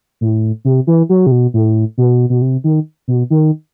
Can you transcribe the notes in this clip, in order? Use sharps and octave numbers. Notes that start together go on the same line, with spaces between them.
A2
C3
E3
F#3
C3
B2
A2
B2
B2
C3
D#3
B2
D#3